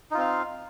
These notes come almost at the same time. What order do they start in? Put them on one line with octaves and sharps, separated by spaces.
D#4 F4 C4 F5